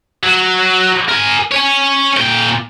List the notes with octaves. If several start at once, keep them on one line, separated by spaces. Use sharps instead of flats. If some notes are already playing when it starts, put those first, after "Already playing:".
F#3
A#4 G#5
C#5 G#5
A#2 G5